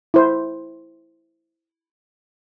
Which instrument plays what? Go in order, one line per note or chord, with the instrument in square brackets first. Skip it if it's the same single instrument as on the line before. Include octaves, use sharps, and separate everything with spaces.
[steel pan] E4 C5